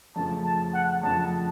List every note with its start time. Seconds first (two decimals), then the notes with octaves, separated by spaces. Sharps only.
0.16 F2 C#3 F3 A3 A5
0.45 A5
0.74 F#5
1.03 F2 C#3 F3 A3 A5